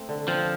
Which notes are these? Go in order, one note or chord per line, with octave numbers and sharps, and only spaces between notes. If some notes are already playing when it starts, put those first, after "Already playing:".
Already playing: A3 C4
D3
F3 C4